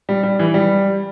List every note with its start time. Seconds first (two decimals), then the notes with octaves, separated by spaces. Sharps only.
0.09 G3
0.23 G3
0.39 E3
0.54 G3